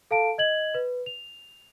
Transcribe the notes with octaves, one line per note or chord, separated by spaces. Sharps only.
A4 F5 A5 D7
D#5 G#6 F#7
B4
F7